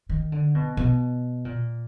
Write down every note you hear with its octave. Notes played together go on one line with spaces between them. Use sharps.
D#3
D3
B2
B2
A#2